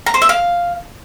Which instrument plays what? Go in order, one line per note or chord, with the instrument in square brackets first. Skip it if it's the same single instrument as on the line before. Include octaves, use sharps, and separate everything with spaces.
[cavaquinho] A#5
C5
E5
F5